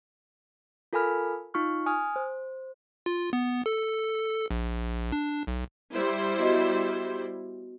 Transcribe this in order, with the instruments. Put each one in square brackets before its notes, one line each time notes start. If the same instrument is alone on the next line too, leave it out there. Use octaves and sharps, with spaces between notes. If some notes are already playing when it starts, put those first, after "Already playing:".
[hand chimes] F4 A4 A#4 G#5 B5 F6
D#4 F4 C#6 F6
G#5 D#6 F6
C5
[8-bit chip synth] F4
B3
A4
A#1
D4
B1
[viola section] G3 E4 C5
[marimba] B3 F#4 D#5